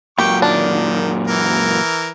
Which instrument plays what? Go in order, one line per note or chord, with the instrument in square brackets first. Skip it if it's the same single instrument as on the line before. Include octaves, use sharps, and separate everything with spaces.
[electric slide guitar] F#2 A#2 [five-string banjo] G4 [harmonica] G5 C#6
[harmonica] D#3 [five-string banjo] D4
[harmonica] E3 A#4